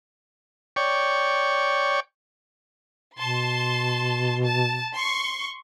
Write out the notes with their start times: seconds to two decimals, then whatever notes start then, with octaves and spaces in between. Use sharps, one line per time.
0.76 C#5 D5 G5 C#6
3.19 B2 A5 C6
4.43 A5
4.94 C6 C#6